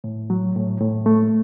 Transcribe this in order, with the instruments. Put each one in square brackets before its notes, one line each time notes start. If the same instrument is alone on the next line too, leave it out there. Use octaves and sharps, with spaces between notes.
[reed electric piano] A2
F#3
A2
A2
A3